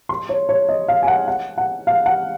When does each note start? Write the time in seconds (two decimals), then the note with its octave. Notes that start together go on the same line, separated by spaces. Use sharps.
0.09 C6
0.29 C#5
0.49 C#5
0.69 D#5
0.88 F5
1.03 G#5
1.08 F#5
1.28 F#5
1.58 F#5
1.87 F5
2.06 F#5